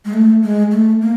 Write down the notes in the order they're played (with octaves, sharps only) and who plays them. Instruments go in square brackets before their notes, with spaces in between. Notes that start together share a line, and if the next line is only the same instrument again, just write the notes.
[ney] G#3
A3
G#3
A3
A#3